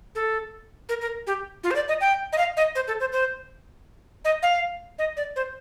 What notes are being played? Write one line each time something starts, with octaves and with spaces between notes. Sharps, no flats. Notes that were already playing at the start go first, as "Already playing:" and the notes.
A4
A#4
A#4
G4
F4
C5
D5
D#5
G5
D#5
F5
D#5
C5
A4
C5
C5
D#5
F5
D#5
D5
C5